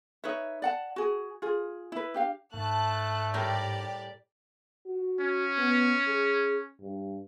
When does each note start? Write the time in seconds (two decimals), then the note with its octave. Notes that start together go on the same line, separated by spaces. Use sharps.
0.24 D#4 B4 C#5 E5
0.62 D5 F#5 A5
0.96 F#4 G#4
1.42 F4 G#4
1.92 E4 B4
2.14 D4 G4 F5
2.54 G#2 A3 A5 F#6
3.34 A2 G3 G4 A#4 D5
4.86 F#4
5.20 C#4
5.58 B3
6.07 G#4
6.80 G2